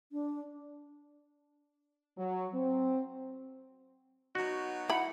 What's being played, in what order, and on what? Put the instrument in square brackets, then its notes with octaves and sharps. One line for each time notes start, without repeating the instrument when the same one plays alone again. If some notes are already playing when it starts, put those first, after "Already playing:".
[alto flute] D4
[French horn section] F#3
C4
[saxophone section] F#3 B3 D#4 [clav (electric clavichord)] F#4
[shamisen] E4 B5 [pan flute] F#5